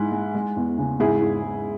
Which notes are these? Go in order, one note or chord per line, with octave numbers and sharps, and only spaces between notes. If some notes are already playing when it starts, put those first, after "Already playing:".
Already playing: G#2 G#3 E4
G#3
G#3
E2
C#3
G#2 E4 G#4
G#2
G#3